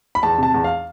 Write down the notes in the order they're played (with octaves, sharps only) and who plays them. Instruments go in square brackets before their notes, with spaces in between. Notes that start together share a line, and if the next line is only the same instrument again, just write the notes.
[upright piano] B5
E2 A5
C3 A5
E2
F5